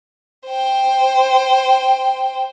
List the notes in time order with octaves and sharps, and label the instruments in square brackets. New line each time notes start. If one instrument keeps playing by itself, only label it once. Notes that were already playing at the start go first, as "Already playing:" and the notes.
[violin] C5 G5